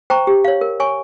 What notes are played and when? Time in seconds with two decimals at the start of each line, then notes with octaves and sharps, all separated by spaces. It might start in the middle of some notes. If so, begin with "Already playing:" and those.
0.10 C5 G5 A#5 C#6
0.27 G4
0.45 C#5 F5
0.61 A#4
0.80 C#5 G#5 C#6